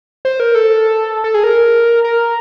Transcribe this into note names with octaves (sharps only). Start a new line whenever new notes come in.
C5
A#4
A4
A4
G#4
A#4
A#4